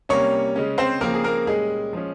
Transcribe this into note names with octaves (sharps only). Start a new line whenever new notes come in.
C3 G3 A#3 C#4 C#5 C#6
C#3 G#3 C#4
C4 C5
C#3 F3 A#3 C4 A#4
G#4
A#3 A#4
A#2 G3 G#3 C#4 G#4
F3 G#3 C#4